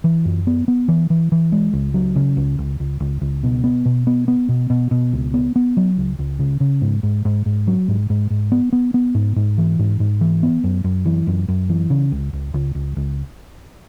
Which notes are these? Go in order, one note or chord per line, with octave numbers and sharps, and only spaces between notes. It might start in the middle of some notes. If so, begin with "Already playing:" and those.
E3
F#2
B3
B3
E3
E3
E3
G#3
C#2
F#3
C#3
C#2
C#2
C#2
C#2
C#2
B2
B3
B2
B3
B3
B2
B2
B2
C#2
B3
B3
F#3
C#2
C#2
C#3
C#3
G#2
G#2
G#2
G#2
F#3
G#2
G#2
G#2
B3
B3
B3
G#2
G#2
E3
G#2
G#2
E3
B3
F#2
F#2
E3
F#2
F#2
E3
C#3
C#2
C#2
C#2
C#2
C#2